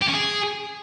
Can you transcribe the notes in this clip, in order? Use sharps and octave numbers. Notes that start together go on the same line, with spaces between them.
G4
C#4
G#4